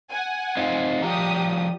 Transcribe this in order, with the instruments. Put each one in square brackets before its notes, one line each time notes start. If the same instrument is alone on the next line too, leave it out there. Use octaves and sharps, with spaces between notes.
[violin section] F#5 G#5
[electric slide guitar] C4 D#4 F4
[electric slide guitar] F3 G3 A#5 [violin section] G4 D#6